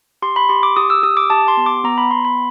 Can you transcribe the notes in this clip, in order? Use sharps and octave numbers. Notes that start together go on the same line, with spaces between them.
G4 C6
B5
G4 C6
D6
G4 D#6
E6
G4 D#6
D6
G4 A5
C6
B3
D6
B3 A#5
B5
B3 C6
B5